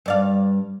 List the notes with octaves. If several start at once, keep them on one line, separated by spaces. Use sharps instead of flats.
G2 D5 F5